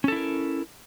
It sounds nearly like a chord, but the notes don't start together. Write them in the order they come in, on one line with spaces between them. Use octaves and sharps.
C#4 A4 E4 A#4